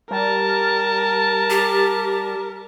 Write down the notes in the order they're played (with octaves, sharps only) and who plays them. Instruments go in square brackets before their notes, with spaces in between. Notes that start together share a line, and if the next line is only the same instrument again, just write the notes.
[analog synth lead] G3 [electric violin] A#4 [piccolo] A5
[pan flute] G4